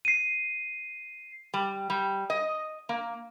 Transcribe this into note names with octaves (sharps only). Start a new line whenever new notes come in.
C7 D#7
G3
G3
D#5
A#3